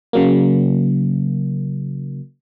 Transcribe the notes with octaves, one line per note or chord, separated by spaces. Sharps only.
C#3 F#3 A#3